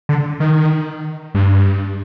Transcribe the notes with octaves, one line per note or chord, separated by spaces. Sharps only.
D3
D#3
G2